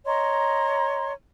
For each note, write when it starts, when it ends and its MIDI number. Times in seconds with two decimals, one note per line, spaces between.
0.06 1.12 73
0.06 1.12 75
0.06 1.12 82
0.06 1.12 84